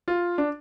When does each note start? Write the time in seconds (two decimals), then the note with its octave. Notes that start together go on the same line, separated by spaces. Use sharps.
0.08 F4
0.38 D4